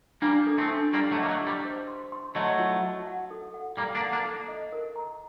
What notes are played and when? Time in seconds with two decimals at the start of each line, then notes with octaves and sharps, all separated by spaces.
0.22 G3 A#3 D4
0.47 A4
0.58 A3 C4
0.70 D4
0.93 G3 A#3 G4
1.11 F#3 A3
1.17 D#5
1.23 A#3
1.29 F#3 A3
1.41 G4
1.47 G3
1.65 C5
1.88 C6
2.12 C6
2.35 F#3 A3 D#5
2.59 F#4
2.83 F#4
3.07 F#5
3.31 A4
3.54 F#5
3.77 G3 A#3 A4
3.95 A#3 D4
4.01 F#5
4.12 A#3 D4
4.25 A4
4.48 D#5
4.72 A#4
4.96 A#5